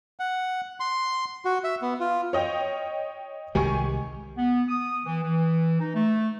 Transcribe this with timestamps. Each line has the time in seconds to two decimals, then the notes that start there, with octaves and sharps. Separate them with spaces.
0.20 F#5
0.80 C6
1.45 F#4
1.64 E5
1.82 B3
2.00 F4
2.33 C#5 D#5 G5
3.55 C2 D#3 G#3 G4 G#5 C#6
4.38 B3
4.69 D#6
5.06 E3
5.23 E3
5.80 D#4
5.95 A3